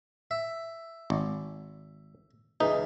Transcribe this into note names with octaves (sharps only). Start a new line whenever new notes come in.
E5
G#1
C#2 E3 D#4